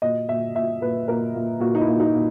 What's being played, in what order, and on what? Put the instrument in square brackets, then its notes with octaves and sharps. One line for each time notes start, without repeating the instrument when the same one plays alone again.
[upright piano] A#2 D#5
A#2 E5
A#2 E5
A#2 B4
A#2 A#4
A#2
A#2 F#4
D#4
E4
A#2
D#4
A#2